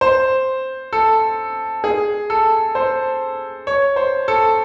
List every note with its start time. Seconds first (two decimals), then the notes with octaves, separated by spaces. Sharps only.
0.01 C5
0.93 A4
1.84 G#4
2.30 A4
2.75 C5
3.67 C#5
3.96 C5
4.28 A4